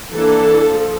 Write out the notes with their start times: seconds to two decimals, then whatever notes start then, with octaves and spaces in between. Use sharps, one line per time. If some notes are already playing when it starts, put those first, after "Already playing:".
0.13 E3 A#3 D4 A4
0.69 F3